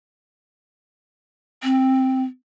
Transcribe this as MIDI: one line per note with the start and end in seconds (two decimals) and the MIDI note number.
1.63 2.23 60